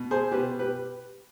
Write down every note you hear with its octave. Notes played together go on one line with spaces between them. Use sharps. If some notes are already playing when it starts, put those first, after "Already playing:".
Already playing: B2
G#4 C5
B2 G4 B4
G4 B4